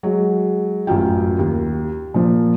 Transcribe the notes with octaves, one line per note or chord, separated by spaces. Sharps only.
F#3 G#3
A1 F#2 F4 G5
D#2
A#2 F3